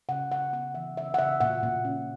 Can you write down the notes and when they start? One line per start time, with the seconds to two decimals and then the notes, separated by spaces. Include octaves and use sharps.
0.09 C#3 F#5
0.31 C#3 F#5
0.53 B3 F#5
0.74 E3 E5
0.97 C#3 E5
1.14 F#5
1.18 C#3 E5
1.40 A#2 F#5
1.63 A#2
1.85 C#4